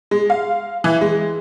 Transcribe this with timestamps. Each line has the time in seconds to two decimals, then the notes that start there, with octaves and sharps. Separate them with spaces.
0.11 G#3
0.30 F5
0.84 E3
1.01 G#3